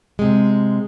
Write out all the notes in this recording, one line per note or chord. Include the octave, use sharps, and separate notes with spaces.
C3 G#3